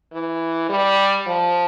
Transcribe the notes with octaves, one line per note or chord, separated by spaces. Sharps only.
E3
G3
F3